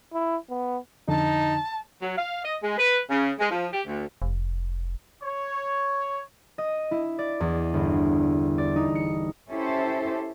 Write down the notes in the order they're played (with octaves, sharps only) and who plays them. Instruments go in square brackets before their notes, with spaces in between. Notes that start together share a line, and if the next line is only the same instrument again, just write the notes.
[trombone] E4
B3
[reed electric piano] F2 D3 [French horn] D#4 [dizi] A5
[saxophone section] F#3
F5
D#5
G#3
B4
C#3
G#3
F3
G4
D2
[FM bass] F1
[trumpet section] C#5
[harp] D#5
E4
D5
E2
G1
D5
D#4
C#7
[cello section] C#4 E4 G4 A4 C5